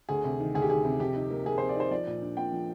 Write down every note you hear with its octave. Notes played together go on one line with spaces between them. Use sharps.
D2 G#4
C3
D#3
D2 G#4
G4
D#3 G#4
C3
F2 G4
D#4
A#3
A#3 G#4
F2 C5
D5
D#4 C5
F3 D5
A#2
D4
A#2 G5
F3